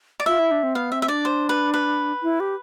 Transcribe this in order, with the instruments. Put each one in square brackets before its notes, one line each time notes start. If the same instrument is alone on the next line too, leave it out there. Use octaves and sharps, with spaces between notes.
[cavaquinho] D5
[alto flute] F4 [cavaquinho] E5
[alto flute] E4
D4
C4
[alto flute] B3 [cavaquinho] F5
[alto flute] C4 [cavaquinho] E5
[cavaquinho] E5
[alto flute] D4 [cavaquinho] D5
[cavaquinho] C5
B4
B4
[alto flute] E4
G4